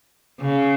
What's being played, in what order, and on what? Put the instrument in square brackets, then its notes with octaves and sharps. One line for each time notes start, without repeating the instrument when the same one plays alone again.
[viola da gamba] C#3